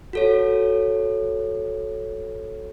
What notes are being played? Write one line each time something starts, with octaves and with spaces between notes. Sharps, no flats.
F#4 A4 C#5